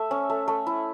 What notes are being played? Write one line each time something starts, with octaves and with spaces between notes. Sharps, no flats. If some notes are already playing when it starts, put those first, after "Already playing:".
Already playing: A3 E5
C#4
A3
A3
E4